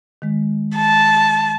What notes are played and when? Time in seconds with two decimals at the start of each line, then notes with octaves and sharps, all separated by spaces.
0.22 D#3 G#3
0.76 A5